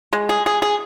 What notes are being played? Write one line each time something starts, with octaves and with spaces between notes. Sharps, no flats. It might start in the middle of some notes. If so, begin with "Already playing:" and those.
G#3
G#4
G#4
G#4